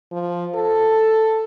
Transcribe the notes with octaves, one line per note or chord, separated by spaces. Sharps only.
F3
A4